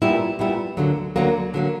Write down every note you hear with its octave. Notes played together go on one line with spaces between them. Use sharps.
A#2 G3 B3 E4
A#2 G3 B3 E4
D2 D3 F#3 A#3
D2 D3 F#3 A#3
D3 F#3 A#3